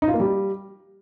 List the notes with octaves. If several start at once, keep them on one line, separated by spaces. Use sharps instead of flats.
D#4
F4
A#3
G3